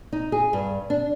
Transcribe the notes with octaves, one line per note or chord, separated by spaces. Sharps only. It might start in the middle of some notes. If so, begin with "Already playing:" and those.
D#4
G#4
G2
D4